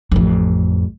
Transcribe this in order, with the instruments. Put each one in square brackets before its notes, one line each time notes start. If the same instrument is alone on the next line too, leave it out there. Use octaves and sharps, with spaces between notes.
[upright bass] A1 F2